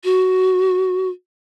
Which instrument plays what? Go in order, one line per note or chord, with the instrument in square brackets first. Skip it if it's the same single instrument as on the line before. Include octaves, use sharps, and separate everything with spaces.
[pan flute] F#4